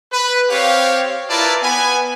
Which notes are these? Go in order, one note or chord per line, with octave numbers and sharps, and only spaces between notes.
B4
C4 G4 C#5 F5
E4 F4 A#4 B4 D5 A5
B3 B4 G#5